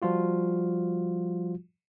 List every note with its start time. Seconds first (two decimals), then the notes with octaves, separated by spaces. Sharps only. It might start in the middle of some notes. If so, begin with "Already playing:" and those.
0.02 F3 G3 F4 F#4